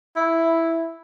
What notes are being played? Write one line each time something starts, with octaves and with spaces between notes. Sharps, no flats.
E4